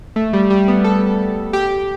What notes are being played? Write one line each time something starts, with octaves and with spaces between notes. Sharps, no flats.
A3
G3
G3
B3
A4
G4